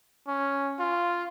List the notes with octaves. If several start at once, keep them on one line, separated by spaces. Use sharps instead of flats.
C#4
F4